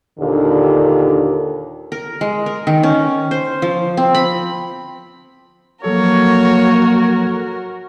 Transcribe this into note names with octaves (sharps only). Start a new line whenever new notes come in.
D#2 A#2 D3
A#4
G#3
A#4
D#3
C#4
C5
F3
C4
B5
F3 F#3 A#3 F#4 A4 A#4 C#5